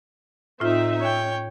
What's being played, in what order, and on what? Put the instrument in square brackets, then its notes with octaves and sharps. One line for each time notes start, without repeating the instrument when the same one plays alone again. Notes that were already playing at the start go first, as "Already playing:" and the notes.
[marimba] A2 F4 [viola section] C4 D#4 E5
[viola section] C#4 [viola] C#5 G5